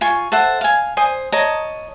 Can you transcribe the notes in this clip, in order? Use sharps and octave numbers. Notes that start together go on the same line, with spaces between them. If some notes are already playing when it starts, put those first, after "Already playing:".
F4 G#5 C#6
A4 C5 E5 F#5
F5 G#5
C5 G#5 D#6
C#5 D#5 A5 A#5